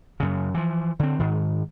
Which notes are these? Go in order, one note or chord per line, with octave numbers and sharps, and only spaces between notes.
F#2 C#3
E3 F3
D3 C4
G#2 D#3